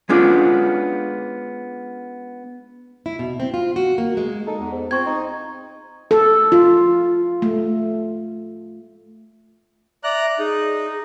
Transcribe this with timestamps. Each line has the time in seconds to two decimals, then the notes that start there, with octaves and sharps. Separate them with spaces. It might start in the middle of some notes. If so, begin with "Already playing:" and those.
0.09 G#3 B3 C#4 D4 F4
3.06 E4
3.19 B2
3.40 C4
3.54 F4
3.76 F#4
3.98 A#3
4.17 G#3
4.47 D#4 A4
4.59 E2
4.72 G#2
4.91 F3 C4 C#6 G#6
5.06 D#4
6.11 A4
6.52 F4
7.42 A3
10.04 D5 E5 A#5 F#6
10.39 D#4 G#4